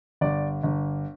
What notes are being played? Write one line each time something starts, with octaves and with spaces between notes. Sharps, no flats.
G1 D5
G1